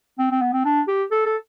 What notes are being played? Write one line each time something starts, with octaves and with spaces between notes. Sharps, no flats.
C4
C4
B3
C4
D4
G4
A4
A4